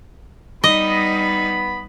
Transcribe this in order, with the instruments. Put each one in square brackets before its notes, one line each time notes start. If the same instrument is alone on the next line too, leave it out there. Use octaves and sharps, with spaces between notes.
[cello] G3 D#4 [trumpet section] B3 B5 [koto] D#5